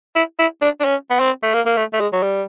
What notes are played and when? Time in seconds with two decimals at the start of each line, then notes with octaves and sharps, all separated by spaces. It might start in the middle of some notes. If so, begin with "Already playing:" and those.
0.16 E4
0.39 E4
0.62 D4
0.81 D4
0.85 C#4
1.10 B3
1.20 C4
1.43 A3
1.54 A#3
1.66 A#3
1.77 A3
1.93 A3
2.00 G#3
2.13 F#3
2.23 G3